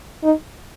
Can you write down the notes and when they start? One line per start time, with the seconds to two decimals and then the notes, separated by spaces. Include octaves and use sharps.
0.23 D#4